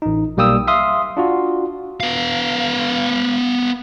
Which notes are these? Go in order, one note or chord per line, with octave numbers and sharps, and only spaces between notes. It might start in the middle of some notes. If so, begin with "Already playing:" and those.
A1 D#4
B1 G3 A#3 G5 D#6 E6
E5 F5 C6 D#6
D4 F4 F#4
B3 F5